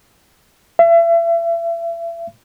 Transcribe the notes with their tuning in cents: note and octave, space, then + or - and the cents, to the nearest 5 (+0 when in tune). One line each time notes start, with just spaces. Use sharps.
E5 +35